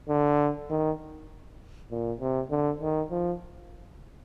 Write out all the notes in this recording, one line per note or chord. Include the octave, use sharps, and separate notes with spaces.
D3
D#3
A#2
C3
D3
D#3
F3